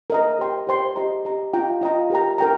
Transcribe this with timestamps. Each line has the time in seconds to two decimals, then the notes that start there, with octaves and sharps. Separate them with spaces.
0.10 A#4 D#5 A#5
0.39 G4 C5 G5 C6
0.67 G4 C5 G5 C6
0.96 G4 D#5 A#5
1.25 G4 D#5 A#5
1.53 F4 D#5 G5 A#5
1.81 F4 D#5 G5 A#5
2.10 G4 A#4 G5 A#5
2.38 A#4 G5 A#5